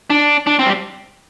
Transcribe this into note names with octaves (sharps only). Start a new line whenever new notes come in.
D4
D4
C4
G3